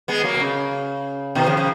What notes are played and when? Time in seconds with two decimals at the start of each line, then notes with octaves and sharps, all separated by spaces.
0.08 G#3 B3
0.24 F#3 A#3
0.34 B2
0.40 C#3
1.35 B2 D#3
1.47 C#3 F3
1.57 C#3 F3